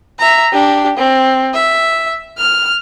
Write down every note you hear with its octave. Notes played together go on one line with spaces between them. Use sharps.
E5 A#5
D4 G4
C4
E5
F6